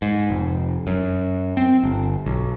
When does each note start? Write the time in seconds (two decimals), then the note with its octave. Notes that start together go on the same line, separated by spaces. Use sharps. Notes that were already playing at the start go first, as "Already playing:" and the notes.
0.02 G#2
0.30 F1
0.87 F#2
1.57 C4
1.84 G1
2.26 B1